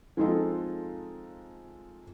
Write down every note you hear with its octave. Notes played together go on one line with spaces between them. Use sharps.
F3 G#3 C4 D#4 F4 A4